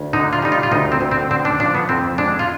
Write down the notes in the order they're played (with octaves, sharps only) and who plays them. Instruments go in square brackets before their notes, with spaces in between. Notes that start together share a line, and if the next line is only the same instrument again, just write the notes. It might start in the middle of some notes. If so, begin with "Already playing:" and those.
Already playing: [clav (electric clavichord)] D2
D3 D#4
F4
G3 D#4
F4
F4
D2 D#4
C4
D2
C4
D3 C4
D4
F3 D4
B3
F2 C4
G#3 D4
F4